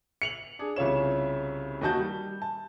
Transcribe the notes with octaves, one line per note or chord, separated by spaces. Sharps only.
C#7 F7 F#7
D4 G#4
C2 C#3 F4 C#5 E7
D#2 D#4 F#4 A5 G6
G3
A5